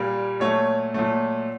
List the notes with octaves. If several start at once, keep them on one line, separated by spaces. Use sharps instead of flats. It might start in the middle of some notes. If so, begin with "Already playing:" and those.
Already playing: A#2 G3 A#3
A#2 F#3 A3 C#5
A#2 F#3 A3